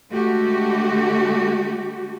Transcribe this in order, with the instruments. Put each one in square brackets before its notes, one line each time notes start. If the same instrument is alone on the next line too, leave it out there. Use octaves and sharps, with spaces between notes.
[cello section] D3 G#3 A3 F#4 G4